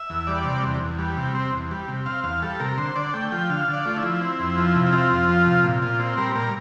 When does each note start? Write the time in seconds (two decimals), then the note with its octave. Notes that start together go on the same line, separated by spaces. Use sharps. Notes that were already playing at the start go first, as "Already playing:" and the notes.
Already playing: E5
0.10 E2
0.27 G3 D5
0.45 C3
0.64 E2
0.81 E2
0.99 G3
1.17 C3
1.35 C4
1.53 E2
1.71 G3
1.88 C3
2.06 C4 F5
2.24 E2 F5
2.43 G3 A4
2.60 C3 A#4
2.77 D3 C5
2.96 D3 D5
3.14 A3 G5
3.31 F3 G5
3.49 D3 F5
3.68 D3
3.73 D5
3.85 A3 F4
3.97 E4
4.03 F3
4.21 C4
4.39 F2
4.57 F3
4.75 C3
4.86 E4
4.92 C4 F4
5.11 F2
5.29 F3
5.46 C3
5.64 A#2
5.82 A#2 F4
5.99 C4
6.17 G3 A#4
6.35 A#2 A#4